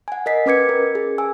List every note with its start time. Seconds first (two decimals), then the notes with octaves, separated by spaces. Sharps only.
0.08 F#5 G#5
0.26 A#4 D#5 B6 C7
0.46 C#4 B4 D6 G#6 C#7
0.69 A#4
0.95 G#4
1.18 G#5 E6